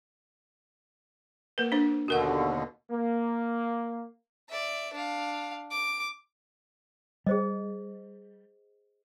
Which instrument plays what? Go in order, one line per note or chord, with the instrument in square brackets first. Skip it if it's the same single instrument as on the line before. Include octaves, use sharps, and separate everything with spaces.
[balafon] A#3 A#4 B4
D4 C5
[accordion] D#2 B2 D3 [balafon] F#4 A#4 F#5
[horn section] A#3
[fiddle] D5 E5
D4 F5
D6
[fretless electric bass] G3 [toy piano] G#4 C5 D#5